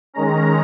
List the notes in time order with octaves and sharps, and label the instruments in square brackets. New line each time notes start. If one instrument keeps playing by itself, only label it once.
[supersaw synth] D#3 G#3 C#4 A#5